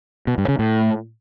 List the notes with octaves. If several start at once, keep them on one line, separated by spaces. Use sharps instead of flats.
B2
G2
C#3
A2